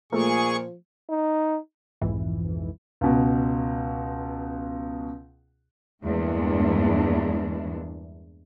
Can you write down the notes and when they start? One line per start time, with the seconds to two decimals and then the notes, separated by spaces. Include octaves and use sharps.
0.12 A#2 F3 A3 A#3 G#4 C#6
1.10 D#4
2.01 B1 F2 G#2 E3
3.01 C#2 B2
6.03 E2 G2 E3 G#3 A#3 D4